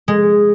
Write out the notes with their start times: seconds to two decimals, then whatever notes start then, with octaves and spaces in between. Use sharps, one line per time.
0.08 G#3